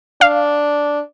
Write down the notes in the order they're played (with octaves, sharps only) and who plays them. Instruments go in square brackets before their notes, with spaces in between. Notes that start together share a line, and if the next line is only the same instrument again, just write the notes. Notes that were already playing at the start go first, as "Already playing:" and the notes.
[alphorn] D4 [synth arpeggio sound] F5